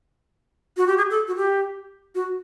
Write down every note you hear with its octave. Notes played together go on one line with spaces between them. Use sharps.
F#4
G4
G#4
A4
F#4
G4
F#4